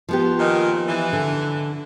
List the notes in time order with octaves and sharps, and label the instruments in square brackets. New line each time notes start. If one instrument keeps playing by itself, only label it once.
[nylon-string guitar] F3 B3 G4
[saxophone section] A#2 D#3
E3
[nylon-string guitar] D3